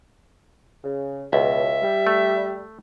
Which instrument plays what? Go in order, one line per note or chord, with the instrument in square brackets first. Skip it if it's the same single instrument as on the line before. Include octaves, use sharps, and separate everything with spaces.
[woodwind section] C#3
[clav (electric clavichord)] C#2 [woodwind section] B2 [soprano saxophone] E5
[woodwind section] G3
[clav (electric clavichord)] A3